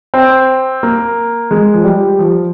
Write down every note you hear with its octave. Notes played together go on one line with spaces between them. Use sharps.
C4
A#3
G#3
F3
G3
F3